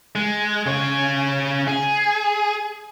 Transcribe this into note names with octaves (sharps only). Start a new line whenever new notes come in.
G#3
C#3 C#5
G#4